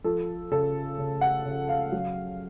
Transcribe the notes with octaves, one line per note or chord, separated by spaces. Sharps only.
F3 A4
C#3 A4
C#3
F#5
C#3
F5
F#3